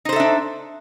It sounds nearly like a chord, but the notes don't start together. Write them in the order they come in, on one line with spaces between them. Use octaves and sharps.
D#4 C5 A4 E5 D4